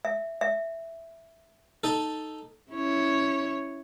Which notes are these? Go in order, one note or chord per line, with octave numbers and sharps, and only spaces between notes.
E5
E5
D#4 A4
C#4 E4 C#5